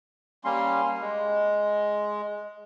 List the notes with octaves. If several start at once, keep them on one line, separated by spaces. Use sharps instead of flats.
G3 A#3 C#4 C6
G#3